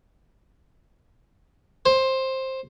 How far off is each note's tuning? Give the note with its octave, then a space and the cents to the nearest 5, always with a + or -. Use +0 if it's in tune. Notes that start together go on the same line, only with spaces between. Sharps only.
C5 +10